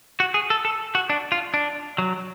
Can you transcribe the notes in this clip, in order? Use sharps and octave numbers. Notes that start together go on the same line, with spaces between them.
F#4
G#4
A4
A4
F#4
D4
F4
D4
F#3